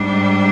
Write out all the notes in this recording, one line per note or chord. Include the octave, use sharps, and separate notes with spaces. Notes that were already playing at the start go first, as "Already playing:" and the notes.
Already playing: G#2 G3 D4